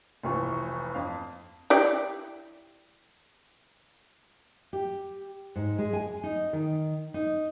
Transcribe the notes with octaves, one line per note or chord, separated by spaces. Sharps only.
F1 C2 E3 F4 C#6
F2 F5
E4 G4 D5
G4
G#2
G#3
G#5
D#4
D#3
D#4